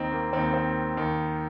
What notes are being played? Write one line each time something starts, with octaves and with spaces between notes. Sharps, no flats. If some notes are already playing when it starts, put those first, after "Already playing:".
Already playing: D#2 D#3 C4 D#4
A#3
D#2 D#3 C4
C4
D#2 D#3